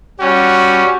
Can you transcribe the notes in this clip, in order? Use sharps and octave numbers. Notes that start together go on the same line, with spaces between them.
G3 C#4 F#4